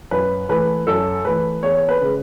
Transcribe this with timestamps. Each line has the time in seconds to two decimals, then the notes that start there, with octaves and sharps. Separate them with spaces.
0.11 F#2 B4
0.49 E3 A3 B4
0.87 F#2 A4
1.25 E3 A3 B4
1.63 E2 C#5
1.89 B4
2.01 C#3 G#3